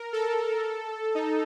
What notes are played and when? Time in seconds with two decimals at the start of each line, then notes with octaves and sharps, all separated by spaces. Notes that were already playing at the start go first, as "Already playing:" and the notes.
Already playing: A#4
0.13 A4
1.15 D#4